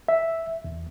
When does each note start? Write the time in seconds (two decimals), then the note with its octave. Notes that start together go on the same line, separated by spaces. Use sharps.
0.08 E5
0.64 E2